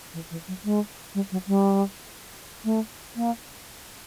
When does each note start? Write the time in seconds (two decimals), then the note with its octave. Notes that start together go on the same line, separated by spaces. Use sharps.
0.14 E3
0.31 E3
0.48 F#3
0.64 G#3
1.14 G3
1.32 F#3
1.47 G3
2.64 A3
3.16 A#3